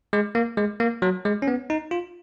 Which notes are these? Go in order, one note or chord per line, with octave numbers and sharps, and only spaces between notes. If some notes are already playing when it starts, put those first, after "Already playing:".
G#3
A#3
G#3
A#3
F#3
G#3
C#4
B3
D#4
F4